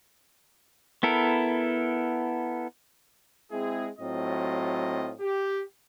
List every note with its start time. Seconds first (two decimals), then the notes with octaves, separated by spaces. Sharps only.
1.03 B3 E4 A4 A#4
3.51 G#3 C4 E4 G#4
3.99 A2 F#3 C4 F4 D#5
5.20 G4